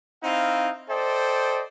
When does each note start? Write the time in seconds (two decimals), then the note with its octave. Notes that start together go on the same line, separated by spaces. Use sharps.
0.24 C4 D#4 E4 F5
0.89 A4 C5 D5 D#5 G5